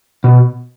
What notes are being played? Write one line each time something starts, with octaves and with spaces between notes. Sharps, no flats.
B2